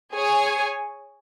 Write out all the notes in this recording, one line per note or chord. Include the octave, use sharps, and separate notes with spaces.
G#4 C#5 G#5